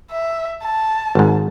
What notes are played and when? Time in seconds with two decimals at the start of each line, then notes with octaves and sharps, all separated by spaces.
0.11 E5
0.63 A5
1.15 G#1 G#2